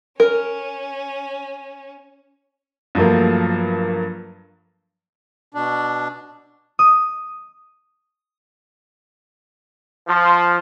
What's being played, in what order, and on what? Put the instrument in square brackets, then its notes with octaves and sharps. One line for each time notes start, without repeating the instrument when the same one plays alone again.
[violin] C#4 [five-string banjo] A#4
[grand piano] G2 F3 F#3 A3 A#3
[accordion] B2 D4
[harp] D#6
[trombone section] F3